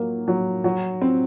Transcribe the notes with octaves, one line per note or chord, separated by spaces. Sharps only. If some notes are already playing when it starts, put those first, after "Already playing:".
Already playing: F#3 A#3
F#3
F#3
C4